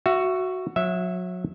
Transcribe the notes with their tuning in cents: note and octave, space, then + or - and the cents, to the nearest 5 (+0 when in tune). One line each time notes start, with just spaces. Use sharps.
F#4 +0 E5 +25
F#3 -30 E5 +0